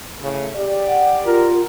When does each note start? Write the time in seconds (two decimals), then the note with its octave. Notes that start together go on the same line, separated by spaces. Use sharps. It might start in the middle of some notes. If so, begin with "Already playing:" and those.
0.22 A2 C#3
0.57 G4 D5
0.88 F#5
1.26 F4 A#4